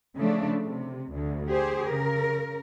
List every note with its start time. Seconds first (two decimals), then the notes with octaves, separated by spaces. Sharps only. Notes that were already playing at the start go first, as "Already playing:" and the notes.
0.16 C#3 F3 A3 D4
0.65 C3
1.13 D2
1.48 G4 G#4 C5
1.88 C#3 A#4